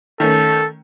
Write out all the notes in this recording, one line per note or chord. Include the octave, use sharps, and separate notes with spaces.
D#3 A3 C#4 A4